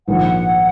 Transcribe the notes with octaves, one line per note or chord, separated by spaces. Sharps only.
A#1 G#2 D#3 F#5